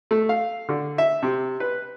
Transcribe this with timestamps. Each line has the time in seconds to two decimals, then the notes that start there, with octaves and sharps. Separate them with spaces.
0.11 A3
0.29 F5
0.69 D3
0.98 E5
1.23 C3
1.60 B4